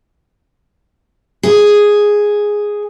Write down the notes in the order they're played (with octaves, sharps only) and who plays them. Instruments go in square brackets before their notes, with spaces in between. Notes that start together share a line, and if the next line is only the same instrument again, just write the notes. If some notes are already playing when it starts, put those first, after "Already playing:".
[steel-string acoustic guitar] G#4